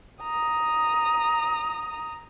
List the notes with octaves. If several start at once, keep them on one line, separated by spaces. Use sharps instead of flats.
A#5 D#6